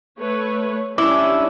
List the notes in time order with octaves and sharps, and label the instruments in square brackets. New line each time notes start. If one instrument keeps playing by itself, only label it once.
[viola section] A3 B4 C#5
[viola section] G3 C#4 D4 [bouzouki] E4 [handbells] D6